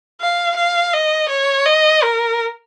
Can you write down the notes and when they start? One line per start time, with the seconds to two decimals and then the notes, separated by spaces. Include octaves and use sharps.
0.21 F5
0.56 F5
0.94 D#5
1.29 C#5
1.66 D#5
2.03 A#4